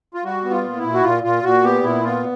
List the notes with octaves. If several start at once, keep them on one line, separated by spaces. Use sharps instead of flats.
F4
G3 F#4
B3
F4
A#2
E4
A#2
F#4
A#2 F4
A#2 F4
A#2 F#4
B3 G4
A#2 E4
B3 F4